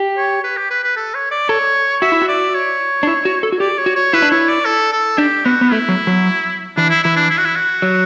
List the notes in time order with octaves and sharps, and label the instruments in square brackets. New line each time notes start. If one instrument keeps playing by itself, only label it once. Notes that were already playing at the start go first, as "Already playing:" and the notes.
Already playing: [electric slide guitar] G4
[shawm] C#5
B4
G4
B4
B4
A4
C#5
D5
[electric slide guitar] A4 [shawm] C#5
[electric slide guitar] F#4 [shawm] E5
[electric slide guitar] E4
F#4
[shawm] D5
C#5
[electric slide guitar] D4
E4
F#4
A4
F#4
[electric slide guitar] G4 [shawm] D5
[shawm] C#5
[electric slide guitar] F#4
[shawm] C#5
[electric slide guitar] E4 [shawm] B4
[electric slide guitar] D4
[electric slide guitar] E4 [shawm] C#5
[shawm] D5
A4
A4
[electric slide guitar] D4 [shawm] G4
[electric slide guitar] B3 [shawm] F#4
[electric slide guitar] B3
[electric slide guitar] A3 [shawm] E4
[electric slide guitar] F#3
F#3
[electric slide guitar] E3 [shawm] D4
[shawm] E4
[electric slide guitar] E3 [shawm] E4
[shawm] D4
E4
F#4
E4
F#4
[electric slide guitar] F#3